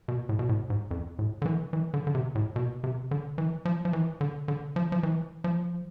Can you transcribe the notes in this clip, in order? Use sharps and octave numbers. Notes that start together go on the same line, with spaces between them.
B2
A2
B2
A2
G#2
F2
A2
D3
E3
E3
D3
D3
C3
A2
B2
C3
D3
E3
F3
F3
E3
D3
D3
F3
F3
E3
F3